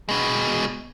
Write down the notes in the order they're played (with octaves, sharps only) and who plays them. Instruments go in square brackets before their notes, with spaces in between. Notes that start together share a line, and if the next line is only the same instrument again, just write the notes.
[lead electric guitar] B2 G#3